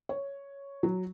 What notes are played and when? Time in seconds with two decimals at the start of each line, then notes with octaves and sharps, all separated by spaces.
0.09 C#5
0.83 F#3